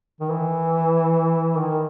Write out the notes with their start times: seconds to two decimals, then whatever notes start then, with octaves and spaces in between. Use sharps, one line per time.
0.20 D#3
0.30 E3
1.57 D#3